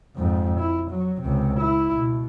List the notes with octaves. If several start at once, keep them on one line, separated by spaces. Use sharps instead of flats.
F2 G#2
E4
F#3
C#2 C3
E4
B2